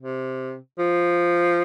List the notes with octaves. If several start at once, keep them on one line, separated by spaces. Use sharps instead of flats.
C3
F3